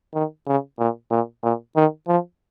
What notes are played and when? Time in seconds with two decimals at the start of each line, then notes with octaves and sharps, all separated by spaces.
0.14 D#3
0.47 C#3
0.79 A#2
1.11 A#2
1.43 A#2
1.76 D#3
2.08 F3